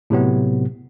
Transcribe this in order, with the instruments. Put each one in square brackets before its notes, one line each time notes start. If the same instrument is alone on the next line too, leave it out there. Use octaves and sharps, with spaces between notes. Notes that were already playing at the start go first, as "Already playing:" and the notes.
[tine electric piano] A2 C3 F#3 B3